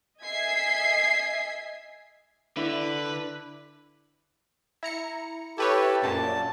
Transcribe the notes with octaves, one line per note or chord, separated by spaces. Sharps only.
D#5 E5 G#5 G#6 B6 C7
D3 E4 B4 D5
E4 A#5 C#7
E4 G4 A4 B4 C#5
A#1 F#2 A#2 A5